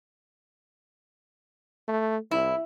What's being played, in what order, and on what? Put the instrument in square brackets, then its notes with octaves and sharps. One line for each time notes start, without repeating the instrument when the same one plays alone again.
[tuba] A3
[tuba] C2 [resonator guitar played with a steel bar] E4